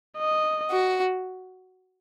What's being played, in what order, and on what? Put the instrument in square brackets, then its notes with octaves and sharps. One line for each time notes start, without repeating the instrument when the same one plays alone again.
[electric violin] D#5
[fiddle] F#4